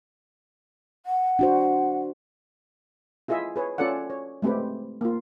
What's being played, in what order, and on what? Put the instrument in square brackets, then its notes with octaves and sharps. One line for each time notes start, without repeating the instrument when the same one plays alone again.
[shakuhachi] F#5
[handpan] D4 F#4 C5
[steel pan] E4 F4 G#4 D#5 E5
G#4 B4 C#5
C#4 F4 A4 D5 F#5
C#5
G#3 A3 C4 G4 B4
A#3 F4